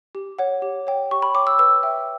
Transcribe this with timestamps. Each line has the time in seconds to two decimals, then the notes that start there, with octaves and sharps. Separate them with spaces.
0.15 G4
0.38 C#5 F#5
0.62 G4
0.87 C#5 G5
1.11 G4 C#6
1.22 B5
1.34 C#5 G5 D6
1.47 E6
1.59 B4 E6
1.83 E5 G5